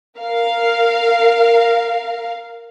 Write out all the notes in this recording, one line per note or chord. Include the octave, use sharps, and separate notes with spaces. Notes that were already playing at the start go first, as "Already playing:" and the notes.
A#4 F5